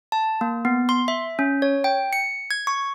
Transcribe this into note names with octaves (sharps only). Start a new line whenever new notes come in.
A5
A#3
B3
C6
E5
C#4
C#5
G5
C#7
G#6
C#6